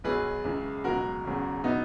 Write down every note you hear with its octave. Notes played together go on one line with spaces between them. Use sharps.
B1 B2 F#3 G#4 B4
C#2 C#3 E3
C#2 B2 F#3 F#4 A#4
E1 E2 C#3 F#3
B2 F#3 B3 D#4